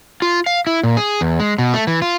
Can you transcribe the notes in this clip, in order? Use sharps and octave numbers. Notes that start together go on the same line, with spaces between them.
F4
F5
E4
A#2
G#4
E2
G#3
B2
A3
E3
F4